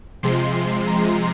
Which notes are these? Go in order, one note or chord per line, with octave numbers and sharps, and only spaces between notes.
C3 F3 G#3 C6
A#5